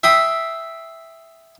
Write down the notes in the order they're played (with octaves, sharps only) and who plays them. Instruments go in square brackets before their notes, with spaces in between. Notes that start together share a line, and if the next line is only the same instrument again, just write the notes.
[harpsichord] E5 G5 B5 C6 D#6